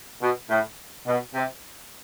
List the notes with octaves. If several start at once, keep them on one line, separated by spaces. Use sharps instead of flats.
B2
A2
B2
C3